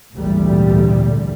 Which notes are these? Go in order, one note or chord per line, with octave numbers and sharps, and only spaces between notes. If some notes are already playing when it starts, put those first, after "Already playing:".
G#1 D2 A#2 E3 G3